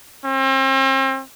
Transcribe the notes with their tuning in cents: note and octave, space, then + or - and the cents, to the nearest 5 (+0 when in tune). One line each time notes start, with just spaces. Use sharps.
C4 +40